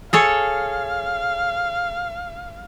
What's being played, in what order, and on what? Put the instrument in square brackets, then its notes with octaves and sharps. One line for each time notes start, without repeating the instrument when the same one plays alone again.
[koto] G#4 A4 C#5 [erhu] F5